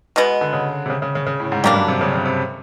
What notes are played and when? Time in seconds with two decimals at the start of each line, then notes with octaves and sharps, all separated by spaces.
0.16 B2 G#3 B3
0.41 D3
0.53 C#3
0.86 C3
0.90 C#3
1.02 C#3
1.15 C#3
1.26 C#3
1.40 A2
1.52 G#2
1.64 F#2 G3 A#3 D4
1.72 G2
1.76 F#2
1.88 C3
2.01 C#3
2.14 C#3
2.26 C3